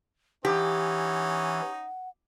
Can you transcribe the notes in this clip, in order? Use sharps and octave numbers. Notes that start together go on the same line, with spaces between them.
E3 C#4 D#4 G4 F#5